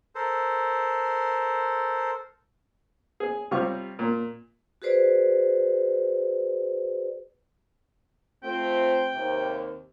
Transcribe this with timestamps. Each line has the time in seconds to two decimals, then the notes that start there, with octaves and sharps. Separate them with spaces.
0.15 A4 A#4 C5
3.20 G#4
3.51 C3 G3 F4 C#6
3.99 A#2
4.82 F#4 G#4 B4 C5 D5
8.43 A3 C4 F4 G5
9.13 D#2 C3